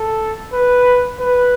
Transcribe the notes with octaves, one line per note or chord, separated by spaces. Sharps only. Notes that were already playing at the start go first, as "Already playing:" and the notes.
Already playing: A4
B4
B4